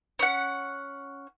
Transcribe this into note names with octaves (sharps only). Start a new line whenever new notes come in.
C#4 F#5